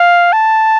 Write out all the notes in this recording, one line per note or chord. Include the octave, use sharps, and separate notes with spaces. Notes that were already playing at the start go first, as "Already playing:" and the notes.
Already playing: F5
A5